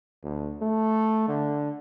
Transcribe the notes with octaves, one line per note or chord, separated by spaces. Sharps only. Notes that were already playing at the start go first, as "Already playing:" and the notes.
D2
A3
D3